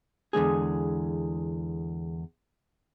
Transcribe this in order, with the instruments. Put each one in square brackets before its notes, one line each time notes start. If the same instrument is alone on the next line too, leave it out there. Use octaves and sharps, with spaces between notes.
[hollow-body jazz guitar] E2 D3 G#3 G#4